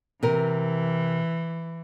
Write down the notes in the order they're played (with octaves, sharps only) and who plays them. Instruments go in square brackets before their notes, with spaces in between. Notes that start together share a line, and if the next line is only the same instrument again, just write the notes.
[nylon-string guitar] C3 A#4 [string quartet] E3